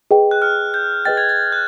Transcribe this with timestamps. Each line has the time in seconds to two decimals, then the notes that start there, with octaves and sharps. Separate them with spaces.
0.11 G#4 B4 D#5 G5
0.31 F#6
0.42 F6
0.74 G6
1.05 G#4 B4 D#5 G5 A6
1.17 G#6
1.29 A6
1.52 F#6